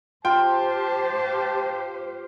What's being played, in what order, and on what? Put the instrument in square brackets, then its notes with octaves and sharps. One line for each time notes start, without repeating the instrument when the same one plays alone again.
[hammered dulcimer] F4 [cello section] G4 C5 [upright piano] G5 [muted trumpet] A5